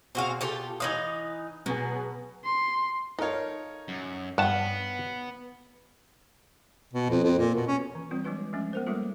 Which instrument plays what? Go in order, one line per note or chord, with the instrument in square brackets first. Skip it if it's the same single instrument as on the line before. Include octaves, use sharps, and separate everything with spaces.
[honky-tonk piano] B2 G#4 [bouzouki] C4 F#4 F5
[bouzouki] F4 G4 A4
[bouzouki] E3 D#4 F5 [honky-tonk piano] D#6 F#7
[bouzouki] B2 [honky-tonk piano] F#3 B3 G#4
[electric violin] C6
[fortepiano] D#4 A#4 C#5 [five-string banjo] A4 F5
[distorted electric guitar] F#2
[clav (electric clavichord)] G2 A5 [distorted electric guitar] B3 [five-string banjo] F5 F#5
[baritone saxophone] B2
F2
F2
A#2
B2
C#4
[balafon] E3
G3 C4 F4
F#3 G#3 D4 F4 B4
F3 G#3 A3 C#4
B3 A#4 C5
F#3 G3 A3 A#3 F4 A4